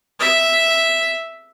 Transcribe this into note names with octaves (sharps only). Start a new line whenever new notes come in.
E5